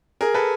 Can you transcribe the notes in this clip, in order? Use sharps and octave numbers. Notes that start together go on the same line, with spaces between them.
G#4 A#4
A4 B4